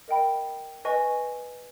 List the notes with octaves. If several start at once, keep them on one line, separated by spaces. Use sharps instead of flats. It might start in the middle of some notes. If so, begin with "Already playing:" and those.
A#4 D#5 G5 B5
B4 D#5 G#5 C#6